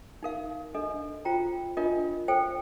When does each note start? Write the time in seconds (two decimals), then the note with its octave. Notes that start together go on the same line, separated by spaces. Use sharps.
0.23 D#4 A#4 F5
0.74 D4 A4 D#5
1.25 F4 C5 G5 A#5
1.77 D4 F4 A#4 D#5
2.28 A4 C5 G5